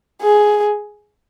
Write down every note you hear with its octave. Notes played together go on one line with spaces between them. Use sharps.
G#4